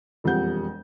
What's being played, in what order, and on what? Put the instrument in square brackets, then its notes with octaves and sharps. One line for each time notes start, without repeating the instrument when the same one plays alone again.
[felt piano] E1 F2 G3 F#5 G6